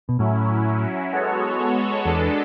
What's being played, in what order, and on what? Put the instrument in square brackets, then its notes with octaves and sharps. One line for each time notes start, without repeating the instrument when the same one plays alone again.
[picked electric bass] B2
[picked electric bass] A2 [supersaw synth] F#3 C#4 E4
[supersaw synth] G#3 B3 F#4 A4 C#5
[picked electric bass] E2 [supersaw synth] G#3 B3 D4 A4